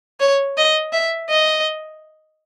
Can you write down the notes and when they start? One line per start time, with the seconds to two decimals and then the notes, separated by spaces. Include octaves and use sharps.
0.20 C#5
0.58 D#5
0.93 E5
1.30 D#5